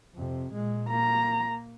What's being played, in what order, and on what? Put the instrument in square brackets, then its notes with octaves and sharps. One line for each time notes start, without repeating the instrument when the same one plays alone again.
[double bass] F2 C3
A#2 G#3
[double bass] A#3 [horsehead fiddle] A#5